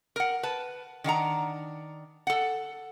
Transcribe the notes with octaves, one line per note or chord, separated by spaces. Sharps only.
A#4 F#5
B4 A5
D#3 D4 F#5 A#5
A4 F#5